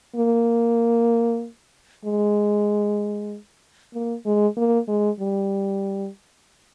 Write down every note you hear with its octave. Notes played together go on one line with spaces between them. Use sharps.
A#3
G#3
A#3
G#3
A#3
G#3
G3